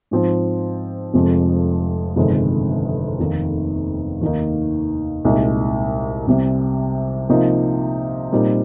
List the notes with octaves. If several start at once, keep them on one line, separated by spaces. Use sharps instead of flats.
G#2 F3 C4
F1 F2 C3 F3 G#3
G1 F2 C3 D#3 G#3
F1 D#2 D#3 A#3 D#4
D#2 D#3 A#3 D#4
C2 A#2 G#3 D#4
C2 C3 G3
C3 F3 A#3 D#4
A#2 G3 C4 D#4 A#4